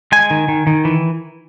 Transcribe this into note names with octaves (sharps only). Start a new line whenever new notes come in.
G#3 G#5
D#3
D#3
D#3
E3